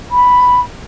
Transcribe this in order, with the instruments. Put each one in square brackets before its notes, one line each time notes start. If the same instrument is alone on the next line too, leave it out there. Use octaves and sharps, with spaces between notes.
[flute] B5